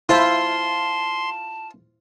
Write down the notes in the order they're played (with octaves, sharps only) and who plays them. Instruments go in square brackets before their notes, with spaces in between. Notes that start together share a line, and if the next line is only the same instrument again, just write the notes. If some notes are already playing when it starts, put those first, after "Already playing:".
[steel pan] E4 C5 E5 [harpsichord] F4 [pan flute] A5 [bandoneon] C6